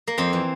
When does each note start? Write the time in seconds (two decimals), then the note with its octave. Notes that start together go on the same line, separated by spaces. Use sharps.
0.08 A#3
0.18 F2 C4
0.33 E3